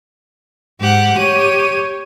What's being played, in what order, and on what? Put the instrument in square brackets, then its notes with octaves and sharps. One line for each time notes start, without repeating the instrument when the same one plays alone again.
[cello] G#2 [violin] G4 F#5
[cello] G4 C#5 [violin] D#7